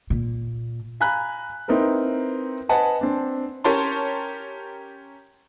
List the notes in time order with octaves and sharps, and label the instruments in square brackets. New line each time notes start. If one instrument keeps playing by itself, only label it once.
[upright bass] A#2
[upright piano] F5 G#5 A#5 B5 F#6
C4 D#4 E4 A#4 B4
B4 C5 D#5 F#5 G#5 A5
C4 D4
[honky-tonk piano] C#4 G4 A#4 C#5 A5 C6